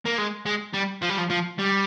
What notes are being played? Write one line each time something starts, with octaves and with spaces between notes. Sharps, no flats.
A#3
G#3
G#3
G3
F3
G3
F3
F3
G3